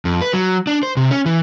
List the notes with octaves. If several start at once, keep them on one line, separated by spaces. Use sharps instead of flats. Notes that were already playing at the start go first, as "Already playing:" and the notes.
F2
B4
F#3
D4
C5
C3
C#4
E3